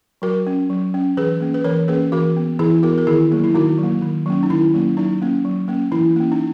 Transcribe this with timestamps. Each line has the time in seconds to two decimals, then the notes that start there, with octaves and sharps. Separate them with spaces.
0.22 F#3 F#4 A#4
0.47 C#4
0.70 F#3
0.94 C#4
1.17 E3 G#4 B4
1.41 A#3 C#4
1.54 B4
1.64 E3 A#4 C#5
1.88 A#3 C#4 G#4 B4
2.12 E3 F#4 A#4
2.36 B3
2.59 E3 E4 G#4
2.83 B3 F#4 A#4
2.98 A#4
3.07 D#3 E4 G#4
3.32 F#3 A#3
3.44 E4
3.55 D#3 D#4 F#4
3.78 F#3 A#3
4.02 D#3
4.26 F#3 A#3 C#4
4.43 D#4
4.50 D#3 E4
4.74 F#3 A#3 C#4
4.97 F#3 D#4
5.22 A#3 C#4
5.45 F#3
5.68 A#3 C#4
5.92 E3 E4
6.16 A#3 C#4
6.32 D#4